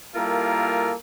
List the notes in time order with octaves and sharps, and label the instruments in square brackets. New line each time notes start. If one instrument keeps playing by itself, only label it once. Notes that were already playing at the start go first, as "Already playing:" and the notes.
[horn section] G3 A#3 E4 F4 A4 A#4